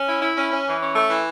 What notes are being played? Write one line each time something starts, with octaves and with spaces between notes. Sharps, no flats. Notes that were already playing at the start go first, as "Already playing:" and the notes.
Already playing: C#4
E4
E4
C#4
C#4
E3
C#4
A3
E3